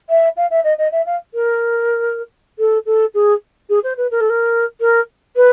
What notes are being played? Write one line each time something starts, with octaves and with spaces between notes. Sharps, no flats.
E5
F5
E5
D#5
D#5
E5
F5
A#4
A4
A4
G#4
G#4
C5
B4
A#4
A4
A#4
A#4
B4